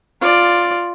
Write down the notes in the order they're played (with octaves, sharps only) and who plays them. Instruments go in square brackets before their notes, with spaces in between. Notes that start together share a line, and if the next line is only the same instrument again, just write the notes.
[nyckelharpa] F4 D5